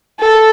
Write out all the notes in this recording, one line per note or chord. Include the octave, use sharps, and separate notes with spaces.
A4